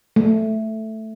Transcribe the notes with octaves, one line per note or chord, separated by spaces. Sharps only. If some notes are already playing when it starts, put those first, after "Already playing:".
A3